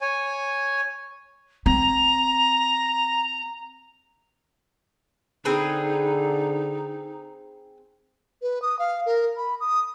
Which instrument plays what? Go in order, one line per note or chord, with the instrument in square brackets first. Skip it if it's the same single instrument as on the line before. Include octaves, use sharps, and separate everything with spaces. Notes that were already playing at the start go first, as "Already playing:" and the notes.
[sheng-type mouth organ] C#5 G#5
[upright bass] C4 [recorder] A#5
[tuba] D3 [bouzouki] C4 G#4 B4 [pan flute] D#4
[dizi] B4
D#6
F5
A#4
B5
D#6